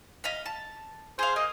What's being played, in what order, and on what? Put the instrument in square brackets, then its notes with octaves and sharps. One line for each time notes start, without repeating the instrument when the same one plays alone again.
[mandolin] D#5 F5 B5
A5
[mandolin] G#4 F5 [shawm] C5
[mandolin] A#3 [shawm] D#5